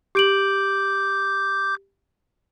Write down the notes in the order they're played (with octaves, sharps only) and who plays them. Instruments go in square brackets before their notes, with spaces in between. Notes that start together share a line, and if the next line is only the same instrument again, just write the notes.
[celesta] G4 D7 F#7 [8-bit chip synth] D6 G6